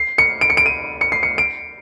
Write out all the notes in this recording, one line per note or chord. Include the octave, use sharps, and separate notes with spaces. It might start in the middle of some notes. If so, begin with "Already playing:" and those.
Already playing: C7
C#7
D7
C#7
D7
D#7
C#7
C7
C#7
D7